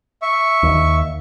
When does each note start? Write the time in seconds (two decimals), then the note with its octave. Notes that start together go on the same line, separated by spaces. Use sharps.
0.22 E5 C#6
0.63 D#2